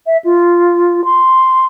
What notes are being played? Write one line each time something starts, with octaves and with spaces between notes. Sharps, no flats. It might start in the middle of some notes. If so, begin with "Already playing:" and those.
E5
F4
C6